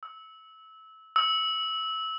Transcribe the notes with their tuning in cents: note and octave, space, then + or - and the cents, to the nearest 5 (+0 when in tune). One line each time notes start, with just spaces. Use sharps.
E6 -20
E6 -20